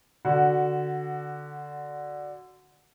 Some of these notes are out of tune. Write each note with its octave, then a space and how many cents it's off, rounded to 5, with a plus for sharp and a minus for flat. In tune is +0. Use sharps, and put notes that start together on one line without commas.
D3 +0 F#4 +0